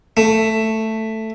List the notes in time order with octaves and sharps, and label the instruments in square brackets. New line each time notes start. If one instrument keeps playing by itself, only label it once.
[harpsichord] A3